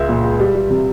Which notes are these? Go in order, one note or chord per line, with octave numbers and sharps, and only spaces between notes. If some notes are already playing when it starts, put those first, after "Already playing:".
Already playing: C#2 G#3 E5
A#2
G#3
G3
G3
C3